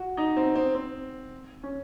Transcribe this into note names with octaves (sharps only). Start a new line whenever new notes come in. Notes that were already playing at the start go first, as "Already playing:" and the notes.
Already playing: F#4
D#4
C4
C4
C4
C#4